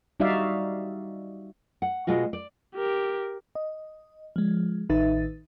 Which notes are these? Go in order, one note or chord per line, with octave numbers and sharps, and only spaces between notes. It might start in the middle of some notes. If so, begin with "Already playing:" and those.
G3 D#4 F#4 D5 E5 F5
F#5
B2 G#3 F4 F#4
D5
G4 A#4
D#5
F3 G#3
A1 D#3 D#4 B4 E5 A6